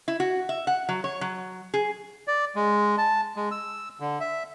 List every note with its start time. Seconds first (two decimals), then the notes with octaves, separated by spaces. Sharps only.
0.08 E4
0.20 F#4
0.49 E5
0.67 F#5
0.89 F#3
1.04 C#5
1.21 F#3
1.74 G#4
2.28 D5
2.56 G#3
2.98 A5
3.36 G#3
3.51 E6
4.00 D3
4.20 E5